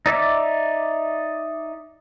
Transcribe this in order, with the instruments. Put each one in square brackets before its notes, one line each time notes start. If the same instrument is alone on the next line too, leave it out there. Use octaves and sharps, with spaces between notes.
[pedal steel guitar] D#4 D5 E5 D6